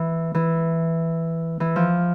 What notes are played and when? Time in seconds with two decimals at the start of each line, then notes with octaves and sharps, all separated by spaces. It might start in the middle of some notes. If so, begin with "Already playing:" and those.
Already playing: E3
0.35 E3
1.60 E3
1.76 F3